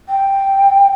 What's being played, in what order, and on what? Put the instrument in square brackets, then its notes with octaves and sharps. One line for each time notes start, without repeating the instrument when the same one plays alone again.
[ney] G5